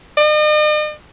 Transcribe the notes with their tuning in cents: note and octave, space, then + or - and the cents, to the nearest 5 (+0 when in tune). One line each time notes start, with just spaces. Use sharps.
D#5 -45